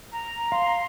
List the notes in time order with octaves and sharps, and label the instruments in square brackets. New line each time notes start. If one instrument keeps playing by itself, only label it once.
[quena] A#5
[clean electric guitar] F5 [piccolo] C6